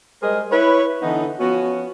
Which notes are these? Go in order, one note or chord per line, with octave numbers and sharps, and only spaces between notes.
G3 G#3 G#4 A#4 C5 D#5
E4 B4 C#5
D3 E3 B3 D#4
F3 B3 C#4 F#4